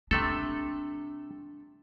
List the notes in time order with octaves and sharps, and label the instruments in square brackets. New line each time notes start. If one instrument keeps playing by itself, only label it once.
[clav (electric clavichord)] C3 A3 A4 [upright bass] D4